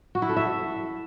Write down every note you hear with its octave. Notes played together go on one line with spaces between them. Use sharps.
F#4
E4
A4
E5